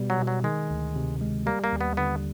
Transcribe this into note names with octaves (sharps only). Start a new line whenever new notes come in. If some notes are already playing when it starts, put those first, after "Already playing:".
Already playing: B2 G3 B3
F#3
B2
F#3
D#3 G#3
D2
C3
G#3
G3 A#3
A#3
D#2
B3
D3 B3